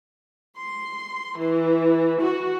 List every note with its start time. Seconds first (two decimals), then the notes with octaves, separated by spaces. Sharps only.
0.57 C6
1.37 E3
2.21 F#4